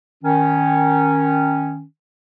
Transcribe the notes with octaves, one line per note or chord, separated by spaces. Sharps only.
D#3 C#4